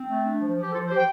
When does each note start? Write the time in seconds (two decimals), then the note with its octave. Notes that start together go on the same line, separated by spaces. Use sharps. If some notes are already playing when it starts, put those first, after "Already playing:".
Already playing: C4
0.08 A3
0.24 D4
0.41 F3
0.56 F3 G4
0.72 F3 F4 A4
0.88 F3 G4 C5
0.97 G5